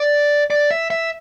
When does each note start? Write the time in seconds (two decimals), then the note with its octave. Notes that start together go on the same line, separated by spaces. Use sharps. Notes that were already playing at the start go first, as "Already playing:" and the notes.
Already playing: D5
0.50 D5
0.71 E5
0.90 E5